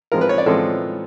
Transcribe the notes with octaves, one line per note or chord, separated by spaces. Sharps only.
A2 F3 G#3 C4 A#4
B4
C#5
D5
A2 F3 G#3 C4 A4